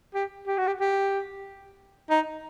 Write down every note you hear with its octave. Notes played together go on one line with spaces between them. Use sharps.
G4
G4
F#4
G4
G4
D#4